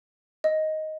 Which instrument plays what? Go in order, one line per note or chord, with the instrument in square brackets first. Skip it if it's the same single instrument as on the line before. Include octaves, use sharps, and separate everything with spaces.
[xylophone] D#5